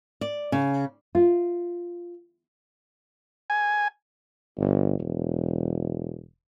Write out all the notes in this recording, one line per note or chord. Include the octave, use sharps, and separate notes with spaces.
D5
C#3
F4
G#5
G1
E1